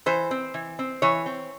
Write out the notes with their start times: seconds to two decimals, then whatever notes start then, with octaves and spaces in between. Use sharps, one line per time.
0.06 E3 C5
0.31 C4
0.54 E3
0.79 C4
1.02 E3 C#5
1.26 C4